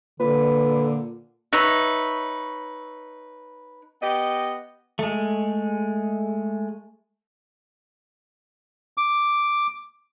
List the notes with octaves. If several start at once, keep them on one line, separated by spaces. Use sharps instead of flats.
A#2 D3 B4
D#4 B4 C#5 E5
B3 G4 D#5
G#3 A3
D6